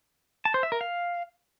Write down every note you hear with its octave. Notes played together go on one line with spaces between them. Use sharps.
A5
C5
E5
A#4
F5